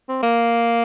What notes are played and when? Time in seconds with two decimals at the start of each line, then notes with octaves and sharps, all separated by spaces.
0.09 C4
0.23 A#3